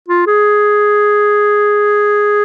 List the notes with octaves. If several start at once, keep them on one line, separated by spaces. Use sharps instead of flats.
F4
G#4